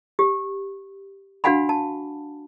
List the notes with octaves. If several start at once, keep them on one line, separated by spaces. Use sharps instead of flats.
G4
D4 F#4 F5 F#5 G#5 B5
A5